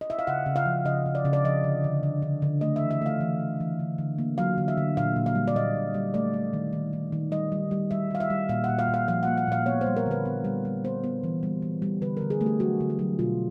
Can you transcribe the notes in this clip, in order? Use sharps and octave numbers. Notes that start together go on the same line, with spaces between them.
D#5
E5
F5
C#3 F#5
C#3
F5
F3
C#3 D#5
C#3
D5
C#3
D5
F3 D#5
D3
D3
D3
D3
D3
A3 D#5
E5
E3
E5
A3 F5
E3
E3
E3
D3
D3
A#3
F#3 F5
D3
E5
D3
A#2 F5
A#2
F5
G3
D5
A#2 D#5
A#2
G3
A3 D5
A3
D#3
D#3
D#3
D#3
G3 D#5
G3
G3
G3 E5
G3 F5
E5
G3
A#2 F5
F#5
A#2
F5
A#2
F5
F3 F5
A#3 F#5
F#5
A#2 F5
B3 C#5
G3 C5
A#4
D3 B4
B3
G3
G3
B3 C5
B3
E3
G3
E3
G3
D3 B4
D3 A#4
G#4
A3
G4
F#3 F#4
D3
F#4
F#3
B2 F4